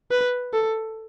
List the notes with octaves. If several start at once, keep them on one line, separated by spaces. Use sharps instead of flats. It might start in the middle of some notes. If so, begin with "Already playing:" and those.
B4
A4